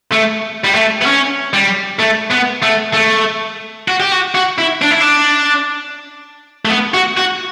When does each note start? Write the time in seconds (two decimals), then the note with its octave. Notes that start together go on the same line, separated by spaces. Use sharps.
0.12 A3
0.64 G3
0.75 A3
1.02 B3
1.06 C#4
1.53 G3
2.00 A3
2.31 B3
2.63 A3
2.94 A3
3.88 F#4
4.00 G4
4.12 F#4
4.35 F#4
4.59 E4
4.82 D4
4.91 E4
5.01 D4
6.65 A3
6.70 B3
6.94 F#4
7.17 F#4